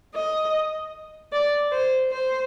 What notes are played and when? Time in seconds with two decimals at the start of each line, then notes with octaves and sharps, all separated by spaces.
0.15 D#5
1.32 D5
1.72 C5
2.12 C5